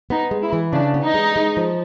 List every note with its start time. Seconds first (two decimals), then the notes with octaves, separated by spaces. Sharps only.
0.10 B3 D#4
0.31 G#3
0.42 E4
0.53 E3
0.73 C#3 D4
0.94 B3
1.05 D#4
1.14 G#3
1.36 G#3
1.57 F3